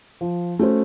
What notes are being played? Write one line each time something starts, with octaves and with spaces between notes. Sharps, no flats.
F3
A3 C#4 F#4 C5